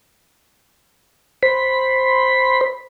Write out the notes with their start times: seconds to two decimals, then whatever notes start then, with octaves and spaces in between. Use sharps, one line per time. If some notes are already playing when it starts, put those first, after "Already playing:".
1.43 C5 B5